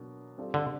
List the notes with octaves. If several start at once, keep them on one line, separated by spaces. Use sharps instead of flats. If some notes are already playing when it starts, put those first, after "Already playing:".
Already playing: B2 F#3 A#3 D4
G3 C4 F4 A4 D5
D3